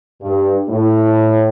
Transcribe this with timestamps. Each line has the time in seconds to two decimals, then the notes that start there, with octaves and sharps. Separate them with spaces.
0.22 G2
0.69 A2